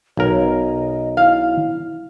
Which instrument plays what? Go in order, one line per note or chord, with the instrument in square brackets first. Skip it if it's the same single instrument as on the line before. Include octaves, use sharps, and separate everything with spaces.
[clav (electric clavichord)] B1 A#4 [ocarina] C#5
[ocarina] D#5
[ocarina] E4 [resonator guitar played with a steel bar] F5